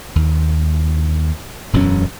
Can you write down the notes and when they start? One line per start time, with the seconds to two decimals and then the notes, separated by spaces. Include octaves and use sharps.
0.16 D#2
1.73 E1 F#2 B2 C#4